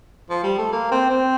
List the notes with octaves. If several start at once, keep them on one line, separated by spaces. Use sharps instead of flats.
F3
G3
A3
A#3
C4
C4